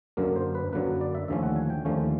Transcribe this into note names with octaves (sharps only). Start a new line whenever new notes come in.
F#2 D3 F#3 A#3 A#4
C5
B4
F#2 D3 F#3 A#3 B4
D5
E5
D#2 D3 F3 A3 C#4 E5
F#5
G#5
G5
D#2 D3 F3 A3 C#4